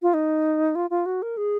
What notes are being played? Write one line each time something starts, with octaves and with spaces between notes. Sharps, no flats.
F4
D#4
F4
F4
F#4
A#4
G#4